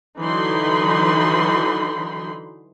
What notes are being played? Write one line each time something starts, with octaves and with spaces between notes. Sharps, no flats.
D3 E3 F#3 D#4 B5 C6